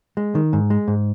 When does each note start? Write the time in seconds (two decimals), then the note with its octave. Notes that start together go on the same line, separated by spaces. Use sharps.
0.17 G#3
0.35 D#3
0.53 G#2
0.70 G#3
0.88 G#2